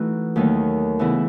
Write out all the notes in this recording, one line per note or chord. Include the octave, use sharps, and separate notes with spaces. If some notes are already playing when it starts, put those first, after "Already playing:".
Already playing: E3 A3 D#4 F#4
D#2 D#3 F#3 A3 D#4
C#3 E3 B3 E4